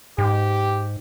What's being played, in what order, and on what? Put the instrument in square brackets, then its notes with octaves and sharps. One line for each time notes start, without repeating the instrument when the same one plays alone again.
[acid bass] G#2 [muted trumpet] G4